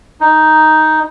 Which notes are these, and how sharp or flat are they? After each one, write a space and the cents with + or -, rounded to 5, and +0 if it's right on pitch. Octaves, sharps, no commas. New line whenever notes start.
D#4 +5